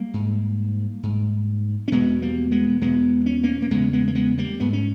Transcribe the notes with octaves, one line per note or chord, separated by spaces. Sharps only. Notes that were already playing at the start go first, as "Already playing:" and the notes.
Already playing: G3 A#3
G#2
G#2
C#4
E2 B2 G#3 B3
G3 A#3
G#3 B3
E2 B2 G#3 B3
C#4
A#3 C#4
A#3
E2 C#3 G#3 B3
G#3 B3
A#3
G#3 B3
G3 A#3
G#2 B3
C#4